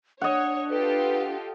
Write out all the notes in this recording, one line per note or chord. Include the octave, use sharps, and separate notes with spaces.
D4 C#5 D#5 F#5
F4 G4 A4 B4